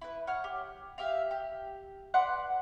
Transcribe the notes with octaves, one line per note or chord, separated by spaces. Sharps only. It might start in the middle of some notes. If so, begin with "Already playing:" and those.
E4 B4
C#5 F#5 F6
G4
G4 E5 F5
G4
B4 D5 F#5 C6